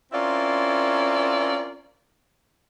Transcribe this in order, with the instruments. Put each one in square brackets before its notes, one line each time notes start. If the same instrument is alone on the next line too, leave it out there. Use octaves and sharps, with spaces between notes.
[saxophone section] C4 C#4 E4 F4 A#4 D5